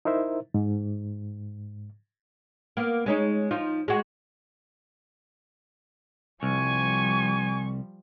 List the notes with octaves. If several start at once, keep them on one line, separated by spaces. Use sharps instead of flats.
D#4 E4 A#4 C5 E5
G#2
A#3 B3
G#3 C#4 D#4
F3 D#4 F4
G#3 F#4
C2 F3 G3 G#5 C#6